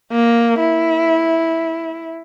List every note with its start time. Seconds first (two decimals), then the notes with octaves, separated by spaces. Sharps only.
0.11 A#3
0.59 E4